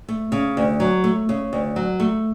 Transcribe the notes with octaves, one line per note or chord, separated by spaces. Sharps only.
A3
C#3
D2
F#3
A3
C#3
D2
F#3
A3